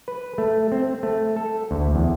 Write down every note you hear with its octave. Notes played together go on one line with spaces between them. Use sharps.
B4
A3
C4
A3
A4
D2
E2